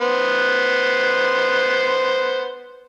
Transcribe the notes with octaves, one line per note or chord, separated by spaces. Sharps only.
B3 C5